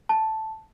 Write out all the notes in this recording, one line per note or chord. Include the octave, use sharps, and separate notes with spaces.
A5